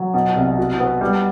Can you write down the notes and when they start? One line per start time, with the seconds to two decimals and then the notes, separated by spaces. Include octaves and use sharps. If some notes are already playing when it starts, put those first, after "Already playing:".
Already playing: F#3
0.14 B2
0.36 C2
0.57 F#4
0.80 B3
1.01 G3